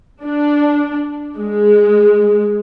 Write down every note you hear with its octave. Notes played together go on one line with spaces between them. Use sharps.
D4
G#3